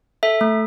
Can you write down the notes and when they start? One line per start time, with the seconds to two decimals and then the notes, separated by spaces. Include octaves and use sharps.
0.23 A4 E5
0.41 A3